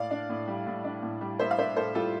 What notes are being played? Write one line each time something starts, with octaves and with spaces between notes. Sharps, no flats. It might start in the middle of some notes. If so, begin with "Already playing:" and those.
Already playing: A2 D5 F5
D4
A2
G3
A2
D4
A2
G3
A2 C5 E5
F5
D4 C5 E5
A2 A4 C5
G3 F4 A4